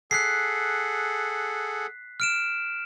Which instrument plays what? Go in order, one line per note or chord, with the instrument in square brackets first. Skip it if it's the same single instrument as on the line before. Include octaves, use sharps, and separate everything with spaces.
[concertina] G#4 A4 F#5 [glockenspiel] F#6 B6 C7
[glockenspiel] F6 D7 E7